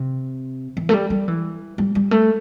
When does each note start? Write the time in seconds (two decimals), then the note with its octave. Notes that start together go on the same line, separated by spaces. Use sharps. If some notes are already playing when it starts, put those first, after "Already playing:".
Already playing: C3
0.77 E3
0.89 A3
0.93 G3
1.10 G3
1.28 E3
1.78 G3
1.95 G3
2.11 A3